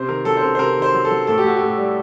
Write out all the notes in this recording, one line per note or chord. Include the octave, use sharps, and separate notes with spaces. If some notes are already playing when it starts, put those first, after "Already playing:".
Already playing: C3 C5
D#3 A#4
F#3 A4
C5
C3 A#4
C5
C3 A#4
D#3
C5
F#3
A4
F#3
A2 A4
G4
A2 F#4
A2 G4
G3